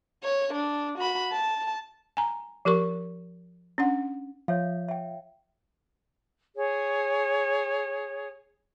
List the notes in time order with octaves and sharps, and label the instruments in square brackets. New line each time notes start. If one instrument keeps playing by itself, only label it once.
[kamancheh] C#5
D4
F#4 B5
A5
[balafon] G#5 A#5
F3 G4 A#4 C#6
C#4 D4 F#5
[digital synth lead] F3 [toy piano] C#5 E5 F5
[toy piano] E5 G5
[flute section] G#4 C#5